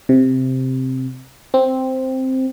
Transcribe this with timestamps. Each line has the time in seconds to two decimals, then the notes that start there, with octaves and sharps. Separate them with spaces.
0.09 C3
1.54 C4